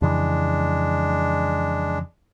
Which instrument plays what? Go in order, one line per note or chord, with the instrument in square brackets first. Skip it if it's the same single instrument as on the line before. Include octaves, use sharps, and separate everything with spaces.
[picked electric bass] F2 C#3 E3 [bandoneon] G#3 D4